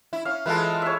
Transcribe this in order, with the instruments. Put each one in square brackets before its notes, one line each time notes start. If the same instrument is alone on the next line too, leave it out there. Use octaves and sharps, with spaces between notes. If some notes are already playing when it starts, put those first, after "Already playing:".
[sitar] E4
[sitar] C#4 [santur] F5
[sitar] E3 G#3 F4 [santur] A4 B4
[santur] C#5 E5